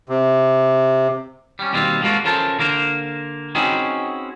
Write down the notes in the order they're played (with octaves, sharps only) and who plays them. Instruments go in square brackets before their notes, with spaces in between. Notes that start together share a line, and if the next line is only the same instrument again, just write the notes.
[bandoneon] C3
[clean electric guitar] G3 C#4
D#2 B2 G3 C4 F4
F3 G#3 A#3 F4 F#4
C#3 F3 A4 A#4 C5 A5
D3 A#3 A#4 C5
C4 C#4 D#4 F#4 G#4 B4